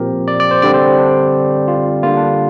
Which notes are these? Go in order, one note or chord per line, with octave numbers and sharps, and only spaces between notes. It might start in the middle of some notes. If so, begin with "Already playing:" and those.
Already playing: A#2 F3 C4 G4 A#4
D5
D5
C5
D3 G3 C4 D5
C5
D4
F4
D3 G3 A#3 F4
D4